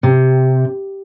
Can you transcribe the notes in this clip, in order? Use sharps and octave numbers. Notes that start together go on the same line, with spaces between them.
C3